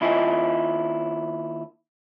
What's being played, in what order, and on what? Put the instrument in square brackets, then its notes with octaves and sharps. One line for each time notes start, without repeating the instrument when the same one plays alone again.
[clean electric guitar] D#2 E4 F4 D#5 G#5